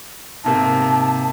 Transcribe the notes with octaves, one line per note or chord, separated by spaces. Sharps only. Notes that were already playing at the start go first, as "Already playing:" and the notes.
G#2 C3 A#3 A5